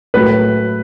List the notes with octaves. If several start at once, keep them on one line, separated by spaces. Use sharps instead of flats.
A2 F#3 A3 B4